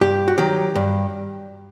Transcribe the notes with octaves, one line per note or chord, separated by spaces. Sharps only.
G2 G4
F#4
D#3 F#3 G4
G2